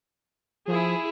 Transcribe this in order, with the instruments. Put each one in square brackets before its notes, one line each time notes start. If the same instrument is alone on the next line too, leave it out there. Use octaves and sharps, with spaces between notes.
[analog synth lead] F3 [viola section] E4 G#4